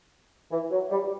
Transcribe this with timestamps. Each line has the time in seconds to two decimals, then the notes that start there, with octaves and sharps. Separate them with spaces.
0.51 E3
0.71 F#3
0.91 G3